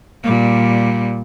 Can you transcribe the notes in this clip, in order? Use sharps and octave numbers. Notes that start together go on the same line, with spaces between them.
A#2 G3